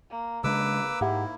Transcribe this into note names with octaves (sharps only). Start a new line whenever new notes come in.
A#3
C#3 G#3 A#3 D4 B4 D6 E6
G#2 E4 G4 E5 F#5